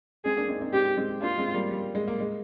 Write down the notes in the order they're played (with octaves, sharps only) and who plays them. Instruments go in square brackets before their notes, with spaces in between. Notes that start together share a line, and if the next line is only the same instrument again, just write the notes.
[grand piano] G#3 C4 [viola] G#4
[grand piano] A#3 D4
C4 D#4
C4 D#4
[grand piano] G#3 C4 [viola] G4
[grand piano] G#3 C4
[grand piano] A#3 D4 [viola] F4
[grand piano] G#3 C4
G3 A#3
G3
G#3
A#3
G#3